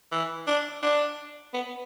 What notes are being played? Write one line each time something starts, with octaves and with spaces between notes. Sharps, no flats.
E3
D4
D4
B3